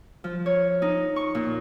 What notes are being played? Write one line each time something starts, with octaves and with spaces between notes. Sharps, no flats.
F3
C#5
D#4
C#6
A#2